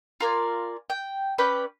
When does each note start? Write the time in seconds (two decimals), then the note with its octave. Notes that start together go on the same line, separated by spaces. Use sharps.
0.20 F4 A#4 D5 G#5
0.90 G5
1.38 C#4 B4 D5 G5